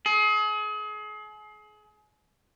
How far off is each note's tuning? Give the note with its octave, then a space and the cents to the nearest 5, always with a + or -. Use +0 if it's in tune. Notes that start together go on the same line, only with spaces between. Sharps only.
G#4 +35